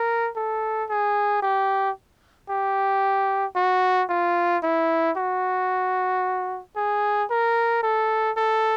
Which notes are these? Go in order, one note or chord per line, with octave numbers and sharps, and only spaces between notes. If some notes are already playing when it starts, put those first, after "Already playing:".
Already playing: A#4
A4
G#4
G4
G4
F#4
F4
E4
F#4
G#4
A#4
A4
A4